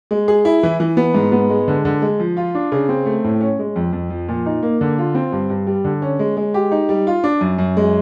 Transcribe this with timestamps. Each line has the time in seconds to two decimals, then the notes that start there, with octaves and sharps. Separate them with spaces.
0.11 G#3
0.28 G#4
0.45 E4
0.63 E3
0.80 E3
0.97 B3
1.15 G#2
1.32 B3
1.49 G#3
1.68 D3
1.85 D3
2.02 G#3
2.20 F3
2.37 F4
2.55 D4
2.72 C#3
2.89 C4
3.06 A3
3.24 A2
3.41 C#4
3.59 G#3
3.76 F2
3.93 F2
4.10 F3
4.28 A#2
4.46 D#4
4.63 A#3
4.81 D3
4.98 F4
5.15 C4
5.32 G2
5.50 G2
5.67 G3
5.85 D3
6.02 C#4
6.19 G#3
6.37 G#3
6.54 G4
6.72 D#4
6.89 G3
7.07 F4
7.24 D4
7.41 F#2
7.58 F#2
7.77 G#3